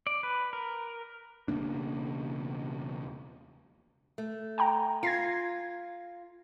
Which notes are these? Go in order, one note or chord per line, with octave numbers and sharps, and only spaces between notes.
D5
B4
A#4
E1 C#3 A#3 D4
A3
G5 G#5 A#5
F4 G#6 A#6 C7